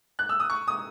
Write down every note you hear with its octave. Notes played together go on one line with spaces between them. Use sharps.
F#6
E6
D#6
C#6
D#6